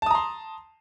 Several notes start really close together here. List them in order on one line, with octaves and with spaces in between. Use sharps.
A5 D#6 A#5 C6